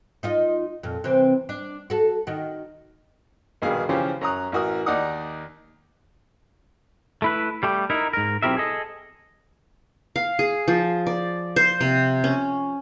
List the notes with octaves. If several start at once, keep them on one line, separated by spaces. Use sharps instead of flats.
D#4 F4 D#5
F2 A#2
C3 E3 C4
D4
F#4 A4
D#3 F#4
A#1 G2 B2 D#3 G#4 F5
C#3 E3 F3 C#4 G4 C5
F#2 C#5 A#5 D#6 F#6
A1 E3 F#4 A#4 D#6
D#2 D#4 D5 F#5 D#6
A3 E4 B4
G3 A3 G4
D#4 E4 A#4
G#2 A#4
B1 C4 E4 G4 A#4 E5
G#4 A4 D#5
F5
G#4
F3
D5
C5
C3
C#4